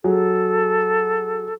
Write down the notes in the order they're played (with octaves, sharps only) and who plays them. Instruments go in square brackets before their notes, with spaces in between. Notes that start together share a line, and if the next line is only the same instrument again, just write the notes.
[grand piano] F#3 G#4 [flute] A4